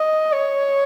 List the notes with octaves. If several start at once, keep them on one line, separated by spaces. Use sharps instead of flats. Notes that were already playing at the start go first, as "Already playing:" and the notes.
Already playing: D#5
C#5